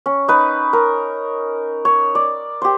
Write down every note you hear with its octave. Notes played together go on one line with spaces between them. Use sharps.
C#4
D#4 B4
A#4
C#5
D5
G4 C5